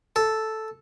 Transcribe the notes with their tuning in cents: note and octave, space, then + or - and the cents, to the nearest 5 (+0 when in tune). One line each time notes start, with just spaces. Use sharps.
A4 -5